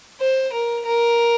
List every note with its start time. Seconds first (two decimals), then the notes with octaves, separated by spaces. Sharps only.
0.20 C5
0.53 A#4
0.86 A#4